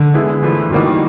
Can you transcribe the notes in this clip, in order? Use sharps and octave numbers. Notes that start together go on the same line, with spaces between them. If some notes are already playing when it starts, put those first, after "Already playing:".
Already playing: D3
E3 G#3 B3 E4
D3 E3 F3 A3
D#3 E3 G3 A#3 D#4 F#4